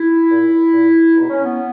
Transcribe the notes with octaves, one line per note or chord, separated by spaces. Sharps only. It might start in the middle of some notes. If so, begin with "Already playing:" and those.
Already playing: E4
A#2
A#2
E2 B2 D#4
C#4
B3